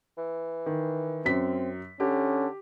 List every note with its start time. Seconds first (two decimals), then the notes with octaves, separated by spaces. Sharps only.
0.18 E3
0.66 D#3
1.25 F#2 C4 B6
2.00 D3 C#4 G4